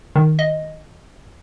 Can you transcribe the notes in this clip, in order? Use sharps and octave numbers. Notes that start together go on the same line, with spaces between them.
D#3
D#5